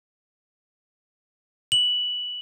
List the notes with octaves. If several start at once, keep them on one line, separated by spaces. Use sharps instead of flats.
F#7